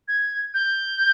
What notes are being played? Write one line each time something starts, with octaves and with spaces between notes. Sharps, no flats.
G#6
G6